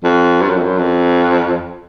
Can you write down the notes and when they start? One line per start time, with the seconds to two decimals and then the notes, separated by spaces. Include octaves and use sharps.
0.04 F2
0.41 G2
0.49 F#2
0.56 F2
0.64 F#2
0.78 F2